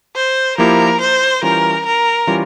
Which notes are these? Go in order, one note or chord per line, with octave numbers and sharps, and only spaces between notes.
C5
F3 A#3 E4 G4 A#4
C5
E3 G3 C#4 F4 A#4
A#4
E3 G3 C#4 F4